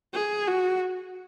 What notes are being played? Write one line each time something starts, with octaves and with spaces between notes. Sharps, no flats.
G#4
F#4